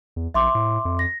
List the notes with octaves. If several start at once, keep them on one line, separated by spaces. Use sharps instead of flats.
E2
A#1 E5 C6 D6
A2
F2
A#6